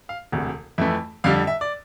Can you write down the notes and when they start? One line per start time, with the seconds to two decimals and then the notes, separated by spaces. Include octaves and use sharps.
0.09 F5
0.32 E1 D2 C3
0.78 F2 E3 A3 E5
1.24 F2 D3 G3 F5
1.47 E5
1.61 D5